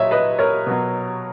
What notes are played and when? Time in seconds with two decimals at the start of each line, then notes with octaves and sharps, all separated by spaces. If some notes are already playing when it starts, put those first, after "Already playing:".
Already playing: A#2 F#3 C#5 D#5 E5
0.11 B4 D#5
0.39 A#4 C#5
0.67 B2 F#3